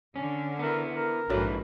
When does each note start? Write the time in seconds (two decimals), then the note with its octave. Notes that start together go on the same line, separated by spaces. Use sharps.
0.16 D3 C#4
0.59 B3 E4 A#4
0.94 A#4
1.30 A#1 G#2 D4 E4 F#4 A4 B4 C#5